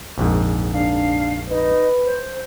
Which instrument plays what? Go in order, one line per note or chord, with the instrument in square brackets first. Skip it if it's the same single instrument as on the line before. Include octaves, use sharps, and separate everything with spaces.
[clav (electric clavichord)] A#1 F2 G#2
[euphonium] D4 [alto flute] F5
[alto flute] D#4 [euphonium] B4
[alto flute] C5